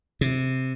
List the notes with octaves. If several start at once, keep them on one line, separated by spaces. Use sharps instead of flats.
C3